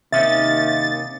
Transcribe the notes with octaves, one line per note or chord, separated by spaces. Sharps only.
D#2 C3 D#3 C#4 E5 A6